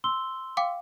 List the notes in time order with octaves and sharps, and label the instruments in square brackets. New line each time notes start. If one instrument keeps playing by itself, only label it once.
[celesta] C6 E6 G7
[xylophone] F5 G5 D6